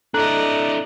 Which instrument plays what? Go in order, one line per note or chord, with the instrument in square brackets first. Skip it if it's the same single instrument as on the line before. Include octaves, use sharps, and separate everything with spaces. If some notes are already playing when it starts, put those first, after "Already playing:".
[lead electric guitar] D4 E4 [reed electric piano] A4 A#5 F#6 [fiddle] D5 D#5